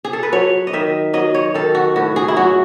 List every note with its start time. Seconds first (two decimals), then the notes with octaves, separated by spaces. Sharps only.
0.05 G#4
0.13 A4
0.23 B4
0.32 F#3 C#5
0.67 D#5
0.73 D#3 E5
1.13 F#3 D#5
1.34 C#5
1.54 D#3 A4
1.75 F#4
1.96 A2 F#4
2.16 G#4
2.28 E4
2.36 F#3 F#4